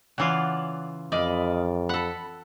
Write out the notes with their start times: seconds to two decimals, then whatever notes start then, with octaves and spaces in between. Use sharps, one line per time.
0.18 C#3 E3 F4 D5 F#5
1.12 F2 D5 D#5 F5 B5
1.89 A4 F#5 B5